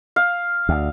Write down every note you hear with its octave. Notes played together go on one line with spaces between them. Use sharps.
F5
D2